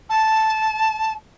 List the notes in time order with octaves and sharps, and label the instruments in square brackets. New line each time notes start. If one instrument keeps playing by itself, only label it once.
[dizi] A5